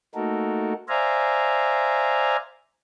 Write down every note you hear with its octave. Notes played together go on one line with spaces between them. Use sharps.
A3 A#3 D#4 F#4 A4 A#4
C5 D5 E5 F5 G#5 A#5